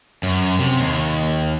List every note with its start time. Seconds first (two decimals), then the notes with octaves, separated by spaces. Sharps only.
0.23 F#2
0.59 C3
0.80 D#2